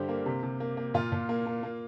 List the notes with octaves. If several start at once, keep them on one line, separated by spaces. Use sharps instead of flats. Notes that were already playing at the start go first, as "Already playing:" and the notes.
Already playing: G2 D3 G3 G4 C5
A#3
C3
C3
A#3
A#3
A#2 F4
A#2
A#3
A#3
A#3